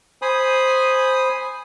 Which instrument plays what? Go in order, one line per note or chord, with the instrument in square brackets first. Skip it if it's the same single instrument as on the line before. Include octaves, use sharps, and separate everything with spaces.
[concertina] C5 G#5 B5 D#6